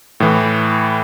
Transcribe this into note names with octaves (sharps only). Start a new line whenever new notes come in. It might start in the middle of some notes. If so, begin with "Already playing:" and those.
A2 E3